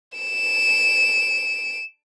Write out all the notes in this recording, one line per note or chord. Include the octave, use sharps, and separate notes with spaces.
D7 E7